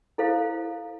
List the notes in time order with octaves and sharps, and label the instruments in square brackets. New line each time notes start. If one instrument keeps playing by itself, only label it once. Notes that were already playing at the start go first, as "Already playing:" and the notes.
[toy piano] E4 A4 C5 F5